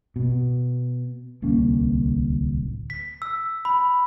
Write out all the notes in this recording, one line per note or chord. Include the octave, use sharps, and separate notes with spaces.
B2
D1 C2 A#3 C#4
B6
E6
B5